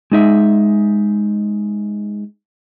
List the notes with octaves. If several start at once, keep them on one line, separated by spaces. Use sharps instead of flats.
G#3 D#4 E5